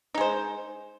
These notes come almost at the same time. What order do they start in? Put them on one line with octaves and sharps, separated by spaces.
D#4 G#3 C5